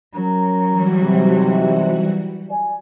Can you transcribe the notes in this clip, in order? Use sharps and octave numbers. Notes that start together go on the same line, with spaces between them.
F#3 C#4 A#4 A#5
E3 G3 F#4
B1 G#2 C3
D5 G#5